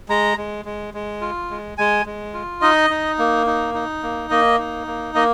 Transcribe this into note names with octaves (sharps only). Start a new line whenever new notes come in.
G#3 A#5
G#3
G#3
G#3
F4
G#3
G#3 G#5
G#3
F4
D#4 D#5
D#4
A#3
D#4
D#4
A#3
A#3 D#5
D#4
A#3
A#3 D#5